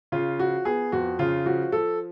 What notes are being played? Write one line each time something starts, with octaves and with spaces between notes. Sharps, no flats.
C#3 F4
F3 F#4
B3 G#4
F2 F#4
C#3 F4
F3 F#4
F3 A4